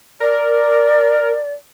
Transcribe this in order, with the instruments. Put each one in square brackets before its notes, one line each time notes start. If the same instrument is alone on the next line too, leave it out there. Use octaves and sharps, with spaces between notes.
[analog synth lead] A#4 [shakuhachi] D5